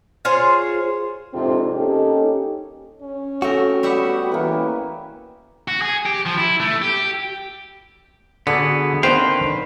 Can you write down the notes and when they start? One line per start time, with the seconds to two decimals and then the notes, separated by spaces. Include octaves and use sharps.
0.25 F4 G#4 C5 C#5
1.34 F2 G#2 C3 C4 D4 F4
1.76 A#3 C#4 D#4 G4 A4
3.02 C#4
3.42 A3 C4 F#4 A#4
3.83 G3 B3 G4 E5 F#5
4.32 E3 A#3 C#4 B4
5.68 F#4
5.82 G#4
6.05 G4
6.26 F3
6.37 E4
6.60 A3
6.82 G4
8.47 D3 B3 F#4 G#4
9.03 D3 D#3 C4 B4 C5 F5 G5